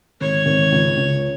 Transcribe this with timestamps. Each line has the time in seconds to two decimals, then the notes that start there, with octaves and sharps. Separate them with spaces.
0.21 G#1 C#5
0.46 G#1
0.72 C#2
0.97 C#2